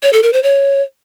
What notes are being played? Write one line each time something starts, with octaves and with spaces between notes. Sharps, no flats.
C#5
A4
A#4
C5
C#5